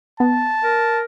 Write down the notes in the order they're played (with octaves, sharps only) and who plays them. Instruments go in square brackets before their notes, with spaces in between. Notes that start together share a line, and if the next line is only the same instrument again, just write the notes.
[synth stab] B3 [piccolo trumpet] A5
[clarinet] A#4